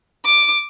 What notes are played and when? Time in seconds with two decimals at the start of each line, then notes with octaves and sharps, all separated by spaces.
0.25 D6